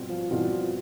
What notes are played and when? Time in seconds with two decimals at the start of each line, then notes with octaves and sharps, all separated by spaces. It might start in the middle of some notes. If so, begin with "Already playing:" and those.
Already playing: B2 G3 C4 F4
0.09 F3
0.30 B2 E3 G3 C4 F4
0.51 F3